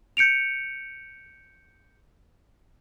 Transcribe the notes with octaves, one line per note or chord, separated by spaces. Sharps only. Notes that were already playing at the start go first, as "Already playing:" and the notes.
G6 C#7 D7 F7